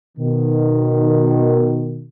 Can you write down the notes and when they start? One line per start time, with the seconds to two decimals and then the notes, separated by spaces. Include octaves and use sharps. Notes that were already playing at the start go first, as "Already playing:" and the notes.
0.18 B2 D#3